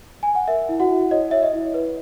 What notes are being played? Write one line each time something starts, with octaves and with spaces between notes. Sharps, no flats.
G#5
F#5
A#4 E5
E4
F#4 F#5
E4
C#5 D#5
C#5 E5
D#5
E4
B4